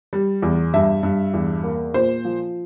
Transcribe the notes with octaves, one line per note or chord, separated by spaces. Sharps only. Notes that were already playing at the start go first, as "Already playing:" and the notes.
G3
E2
G2 E5
G2
E2
A#3
A#2 C5
F3